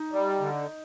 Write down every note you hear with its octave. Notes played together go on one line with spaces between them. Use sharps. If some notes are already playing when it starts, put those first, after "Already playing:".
Already playing: D#4
G3
D3